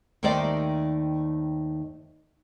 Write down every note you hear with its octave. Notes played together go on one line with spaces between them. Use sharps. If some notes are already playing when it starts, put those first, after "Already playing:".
D#2 D#3 A3 C5 D5 G5